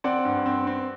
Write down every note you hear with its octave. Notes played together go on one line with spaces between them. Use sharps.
C4 D5 F#5
G2
C4
C4